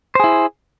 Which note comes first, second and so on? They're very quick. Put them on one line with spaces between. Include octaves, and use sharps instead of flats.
C5 G#4 E4